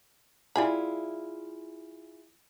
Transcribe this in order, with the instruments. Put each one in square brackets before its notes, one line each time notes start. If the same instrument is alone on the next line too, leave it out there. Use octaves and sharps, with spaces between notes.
[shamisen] G3 G#5 B5 [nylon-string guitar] E4 F4 G#4